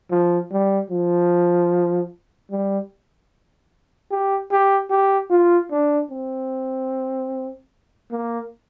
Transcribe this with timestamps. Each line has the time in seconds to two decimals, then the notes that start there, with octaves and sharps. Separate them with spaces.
0.11 F3
0.51 G3
0.90 F3
2.50 G3
4.11 G4
4.51 G4
4.90 G4
5.30 F4
5.71 D4
6.10 C4
8.11 A#3